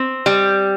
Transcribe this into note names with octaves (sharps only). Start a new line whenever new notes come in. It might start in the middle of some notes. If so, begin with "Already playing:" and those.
Already playing: C4
G3